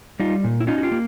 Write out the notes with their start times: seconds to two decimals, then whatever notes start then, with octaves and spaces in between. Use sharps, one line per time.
0.20 G3 D#4 F4
0.44 A#2
0.60 E4
0.67 C#4 D#4 F4
0.78 F#4
0.83 F4 G4
0.92 A#3